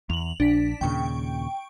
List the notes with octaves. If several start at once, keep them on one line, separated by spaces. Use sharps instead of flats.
E2 F7 F#7
A#1 D4 B6
D#2 A#2 C#3 G5 C#6